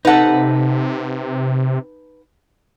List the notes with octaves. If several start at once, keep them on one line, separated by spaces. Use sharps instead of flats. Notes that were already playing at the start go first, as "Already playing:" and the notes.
C3 D#4 A4 B4 F#5